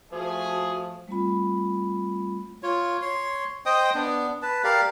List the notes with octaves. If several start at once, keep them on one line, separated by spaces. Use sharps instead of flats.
F3 A3 F#4 G#4
G3 A3 C4 F4 B5
F4 C#5
C#5 C6
C5 D#5 G5 D#6
B3 D4
B4 A5
G4 A#4 D5 F5